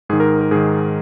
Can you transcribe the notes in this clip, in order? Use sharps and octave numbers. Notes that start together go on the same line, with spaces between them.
G#2 D#3 G#4
A#4
A#4
G#2 D#3 G#4